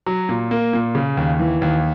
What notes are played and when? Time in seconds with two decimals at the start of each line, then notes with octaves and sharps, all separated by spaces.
0.06 F#3
0.29 A#2
0.51 A#3
0.73 A#2
0.95 C#3
1.17 D#2
1.39 E3
1.62 D#2